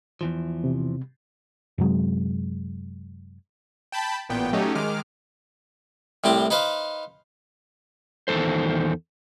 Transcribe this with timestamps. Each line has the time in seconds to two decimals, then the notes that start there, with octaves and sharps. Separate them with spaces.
0.21 E2 E3 F3
0.64 C3
1.78 F#2 C3 F#3 G#3
3.92 G5 A5 B5 G6
4.29 A1 A#2 B3 G5
4.53 F#3 A3 C#4 D#4 G4
4.75 D#3 G#3 D6 F6
6.24 C2 A2 C4 G4
6.51 D#4 B4 C5 F5
8.28 E2 D#3 E3 A4 C5